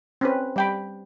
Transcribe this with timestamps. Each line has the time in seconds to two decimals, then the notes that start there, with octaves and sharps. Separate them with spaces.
0.21 C4 C#4 B4
0.56 G3 G5 B5